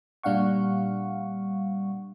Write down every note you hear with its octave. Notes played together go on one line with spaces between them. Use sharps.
A#2 G3 D4 F5 F#5 C#6